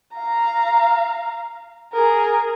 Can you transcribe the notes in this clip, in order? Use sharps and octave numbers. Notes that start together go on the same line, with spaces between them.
F5 A#5
G#4 A#4